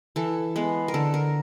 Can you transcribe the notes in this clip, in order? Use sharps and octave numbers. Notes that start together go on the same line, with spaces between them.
E3 A4
G#3 B3
A#4
D3 A4
A#4